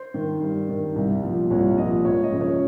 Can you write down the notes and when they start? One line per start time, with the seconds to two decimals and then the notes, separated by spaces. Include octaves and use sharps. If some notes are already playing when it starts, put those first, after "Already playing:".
Already playing: C5
0.14 D#3
0.41 G2
0.69 D#3
0.96 C2
1.23 A#2 F3
1.50 C2 C#5
1.78 A#2 F3 D#5
2.05 C#2 C#5
2.23 D#5
2.32 C#3 F3
2.41 C#5